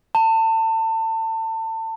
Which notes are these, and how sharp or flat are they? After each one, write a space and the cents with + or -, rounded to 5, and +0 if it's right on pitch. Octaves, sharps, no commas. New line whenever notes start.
A5 +30